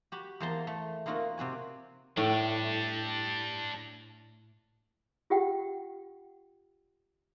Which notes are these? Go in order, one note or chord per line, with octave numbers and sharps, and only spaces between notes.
F#4 G4 B5
E2 A#3 C5 A5 A#5 C6
A3
A#3 C4 D#4 F4 F#4
C3 C4 F#4 G#5
A2 D4 G4
F4 G4 F#5 G5